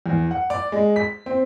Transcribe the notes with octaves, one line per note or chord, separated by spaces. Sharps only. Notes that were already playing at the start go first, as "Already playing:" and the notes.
E2
F#5
D5
G#3
B6
C4